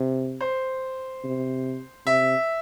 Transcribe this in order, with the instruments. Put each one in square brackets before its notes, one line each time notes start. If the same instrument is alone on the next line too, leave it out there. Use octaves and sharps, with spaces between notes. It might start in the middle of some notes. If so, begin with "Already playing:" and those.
Already playing: [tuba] C3
[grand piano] C5
[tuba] C3
[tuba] C3 [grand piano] E5